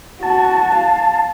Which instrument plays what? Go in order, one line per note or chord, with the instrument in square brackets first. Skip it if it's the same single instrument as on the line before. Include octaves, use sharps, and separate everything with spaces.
[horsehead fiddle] F#4 [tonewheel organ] A5
[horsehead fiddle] F5